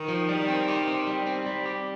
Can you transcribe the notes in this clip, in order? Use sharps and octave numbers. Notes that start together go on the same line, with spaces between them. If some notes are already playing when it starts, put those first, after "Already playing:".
Already playing: D#3
F3
G3
C4
G4
C4
G3
C4
G3
G4